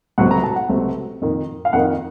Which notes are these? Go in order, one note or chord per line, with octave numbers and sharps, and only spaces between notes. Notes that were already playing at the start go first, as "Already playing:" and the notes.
C#2 C3 F#3 A3 C4 F#5
A#5
A5
F#5
C#2 C3 F#3 A3 C4
F2 D#3 A#3 D#4
F5
F2 D#3 A#3 D#4 F#5